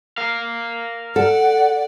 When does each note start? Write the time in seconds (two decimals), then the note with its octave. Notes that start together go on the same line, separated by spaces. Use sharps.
0.18 A#4 F5
1.16 A4 D5 F#5